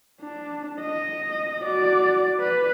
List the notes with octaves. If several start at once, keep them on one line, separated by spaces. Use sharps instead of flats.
D4
D#5
F#4 D5
B4